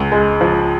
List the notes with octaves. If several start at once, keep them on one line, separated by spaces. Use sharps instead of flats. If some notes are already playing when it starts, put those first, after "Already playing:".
Already playing: C#2
G#3
F3